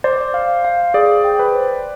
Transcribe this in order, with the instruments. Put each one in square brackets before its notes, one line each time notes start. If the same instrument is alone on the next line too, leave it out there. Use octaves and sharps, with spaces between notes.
[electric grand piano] C5 [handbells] D5
[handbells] F5
F5
[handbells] G#4 [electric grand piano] D5
[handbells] G5
[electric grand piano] B4
[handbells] C5